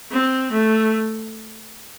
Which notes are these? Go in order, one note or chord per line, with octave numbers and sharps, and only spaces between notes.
C4
A3